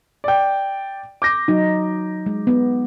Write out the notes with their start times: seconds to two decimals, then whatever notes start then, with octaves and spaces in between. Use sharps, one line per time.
0.24 D5 G5
1.22 D6 G6 A#6
1.48 F#3 D#4
2.26 G#3
2.47 B3